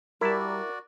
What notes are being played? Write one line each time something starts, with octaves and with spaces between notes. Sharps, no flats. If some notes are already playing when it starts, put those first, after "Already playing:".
G3 E4 F#4 A#4 D5 A5